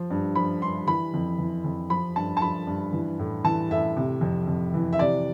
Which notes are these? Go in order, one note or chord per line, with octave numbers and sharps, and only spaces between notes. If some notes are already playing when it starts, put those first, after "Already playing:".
Already playing: F3
G2
F3 B5
G2 C6
E3 B5
F2
E3
F2
F3 B5
G2 A5
A5
F3 B5
G2
E3
A2
E3 A5
A2 E5
C3
F2
F2
E3
E5
C3 D5